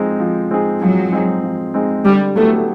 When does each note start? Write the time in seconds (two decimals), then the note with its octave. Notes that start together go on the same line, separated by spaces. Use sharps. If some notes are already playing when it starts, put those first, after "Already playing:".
Already playing: F3 G#3 C4 D#4 G#4
0.20 F3
0.51 G#3 C4 D#4 G#4
0.81 F3 F#3
1.12 G#3 C4 D#4 G#4
1.44 F3
1.74 G#3 C4 D#4 G#4
2.05 D3 G3
2.36 F#3 A3 B3 E4 G4